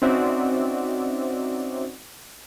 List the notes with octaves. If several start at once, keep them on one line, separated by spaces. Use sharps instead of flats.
C4 C#4 D#4 F#4 D5 E5